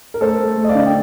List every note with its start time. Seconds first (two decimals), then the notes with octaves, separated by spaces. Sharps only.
0.14 A#4
0.21 A3 A4 C5
0.39 A3
0.57 A3
0.64 D#5
0.69 D5 F5
0.75 D3
0.86 G5